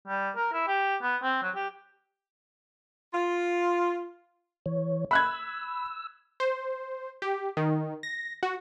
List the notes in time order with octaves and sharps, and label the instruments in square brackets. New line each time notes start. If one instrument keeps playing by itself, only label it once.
[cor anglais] G3
A#4
E4
G4
B3
C4
F#3
G4
[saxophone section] F4
[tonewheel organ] E3 C#5
[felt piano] B5 F#6 G#6 [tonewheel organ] E6
[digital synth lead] C5
G4
D#3
A#6
F#4